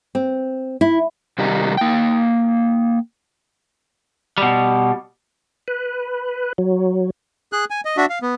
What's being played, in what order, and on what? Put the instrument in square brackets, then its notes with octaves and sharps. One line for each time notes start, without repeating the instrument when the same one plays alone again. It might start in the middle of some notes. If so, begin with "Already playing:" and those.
[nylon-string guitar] C4
E4
[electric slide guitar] C3 D#3 G3 D#4 A#5
A#3 G5
[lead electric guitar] B2 G3
[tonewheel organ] B4
F#3
[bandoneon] G#4 F#6
G#5
D#5
D4 F#4 E5
F5
B3